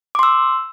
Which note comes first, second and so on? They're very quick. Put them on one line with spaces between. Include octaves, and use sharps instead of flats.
D6 C6 E6